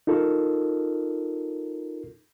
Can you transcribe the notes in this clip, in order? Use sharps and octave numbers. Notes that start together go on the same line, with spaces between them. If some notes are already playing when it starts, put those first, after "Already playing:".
D#4 F4 A4 A#4